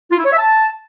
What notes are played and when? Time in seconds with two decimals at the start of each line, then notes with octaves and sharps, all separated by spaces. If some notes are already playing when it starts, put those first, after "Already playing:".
0.10 F4
0.17 E4
0.24 C#5
0.31 E5
0.38 A5